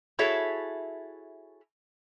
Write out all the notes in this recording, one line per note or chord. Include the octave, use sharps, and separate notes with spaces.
E4 F#4 G#4 A4 C#5 E5